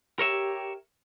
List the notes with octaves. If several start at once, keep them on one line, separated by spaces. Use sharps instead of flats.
G4 A#4 C#5 E5